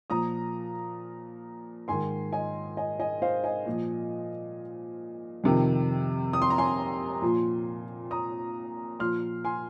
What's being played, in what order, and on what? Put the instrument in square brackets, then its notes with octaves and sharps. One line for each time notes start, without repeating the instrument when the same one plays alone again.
[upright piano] A#2 F3 A#5 D#6
G#2 D#3 G#5 C6
D#5 G#5
D#5 G#5
D#5 G#5
C5 F5
D#5 G#5
A#2 F3
F2 C3 D#3
D#6
C6
A#5
G#5 C6
A#2 F3
A#5 D#6
A#2 F3 C6 F6
G#5 C6